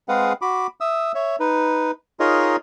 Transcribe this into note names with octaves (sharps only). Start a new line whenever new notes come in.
G#3 C4 G#4 B4 F5 F#5
F#4 B5 D6
E5 D#6 E6
C#5 E5
D#4 B4
D#4 F4 G#4 A#4 C#5 D#5